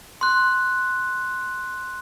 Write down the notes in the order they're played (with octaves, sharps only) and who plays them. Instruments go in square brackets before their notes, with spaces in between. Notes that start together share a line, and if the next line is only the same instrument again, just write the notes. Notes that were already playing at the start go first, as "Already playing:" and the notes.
[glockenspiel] C6 F#6